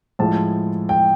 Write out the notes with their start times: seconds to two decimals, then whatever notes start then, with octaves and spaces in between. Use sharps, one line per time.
0.19 A2 F3 G#3 A5
0.89 G5